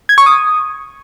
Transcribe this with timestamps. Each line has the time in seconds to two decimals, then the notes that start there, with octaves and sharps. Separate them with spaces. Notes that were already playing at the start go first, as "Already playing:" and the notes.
0.09 G#6
0.18 C#6
0.26 D#6